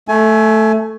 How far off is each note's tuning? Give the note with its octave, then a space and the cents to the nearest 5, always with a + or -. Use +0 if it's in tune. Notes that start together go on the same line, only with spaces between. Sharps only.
A3 +0 G#5 +25